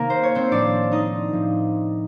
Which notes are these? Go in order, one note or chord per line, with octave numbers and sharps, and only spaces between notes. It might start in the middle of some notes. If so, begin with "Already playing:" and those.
Already playing: C3 D#3 A#3 A#4
C5
C#5
C4 C5
A2 F3 D4 D5
D#4 D#5
A2 F3